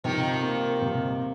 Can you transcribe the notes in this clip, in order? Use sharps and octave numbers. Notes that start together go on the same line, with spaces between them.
C3 D#3 F3
A#3
C3